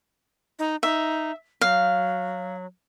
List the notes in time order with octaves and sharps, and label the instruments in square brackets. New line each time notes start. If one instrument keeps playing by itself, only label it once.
[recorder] D#4
[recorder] D#4 [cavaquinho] E5
[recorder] F#3 [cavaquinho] F5